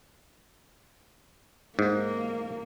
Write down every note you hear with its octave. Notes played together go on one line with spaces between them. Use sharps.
G#2 A#3